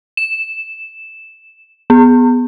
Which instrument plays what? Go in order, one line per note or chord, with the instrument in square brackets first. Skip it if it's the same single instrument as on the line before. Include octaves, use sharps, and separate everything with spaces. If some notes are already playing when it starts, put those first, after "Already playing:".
[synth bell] E7
B3